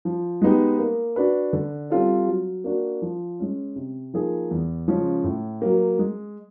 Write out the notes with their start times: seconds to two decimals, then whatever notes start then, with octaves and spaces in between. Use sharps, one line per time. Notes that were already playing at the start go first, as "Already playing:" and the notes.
0.05 F3
0.42 G#3 B3 D#4 G4
0.79 A#3
1.16 D4 F#4 B4
1.53 D3
1.90 G3 C4 F4 A4
2.27 F#3
2.64 A#3 D4 F#4
3.02 F3
3.40 G#3 C#4
3.76 C3
4.14 F3 A#3 D#4 G#4
4.51 E2
4.88 C#3 F3 G#3 C#4
5.24 A2
5.62 F#3 A#3
5.99 G#3